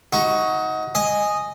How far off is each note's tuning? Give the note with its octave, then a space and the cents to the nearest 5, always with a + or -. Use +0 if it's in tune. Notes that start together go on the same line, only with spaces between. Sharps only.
D#4 +25 F#4 +0
D#5 -5 G#5 +0